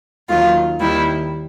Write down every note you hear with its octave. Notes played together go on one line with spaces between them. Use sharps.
D#2 D#3 F#3 F4
D#2 D#3 G3 E4